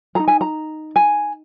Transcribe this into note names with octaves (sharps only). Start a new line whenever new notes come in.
D#4 G#4 A#5
G#5
A#5
G#5